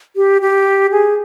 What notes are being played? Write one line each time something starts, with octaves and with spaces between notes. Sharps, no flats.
G4
G4
G#4